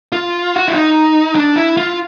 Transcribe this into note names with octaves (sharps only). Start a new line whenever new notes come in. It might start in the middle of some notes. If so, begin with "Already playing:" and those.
F4
F#4
E4
D#4
D4
E4
F4